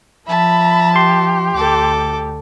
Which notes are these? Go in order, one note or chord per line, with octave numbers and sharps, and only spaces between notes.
F3 E5 A5 B5
G4 C6
D2 A4 D6